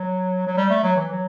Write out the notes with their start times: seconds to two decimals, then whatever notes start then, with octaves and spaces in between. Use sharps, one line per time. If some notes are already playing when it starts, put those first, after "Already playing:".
Already playing: F#3
0.47 F#3
0.57 G3
0.70 A3
0.83 F#3
0.97 E3
1.11 F#3